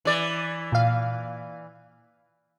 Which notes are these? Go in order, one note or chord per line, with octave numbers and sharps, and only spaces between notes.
E3 D5
A#2 F5